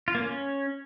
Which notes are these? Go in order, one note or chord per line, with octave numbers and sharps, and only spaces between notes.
F4
A#3
C#4